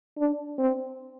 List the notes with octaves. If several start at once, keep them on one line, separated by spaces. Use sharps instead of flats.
D4
C4